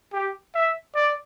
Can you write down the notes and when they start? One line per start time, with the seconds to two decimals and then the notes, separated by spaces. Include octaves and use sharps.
0.13 G4
0.55 E5
0.95 D5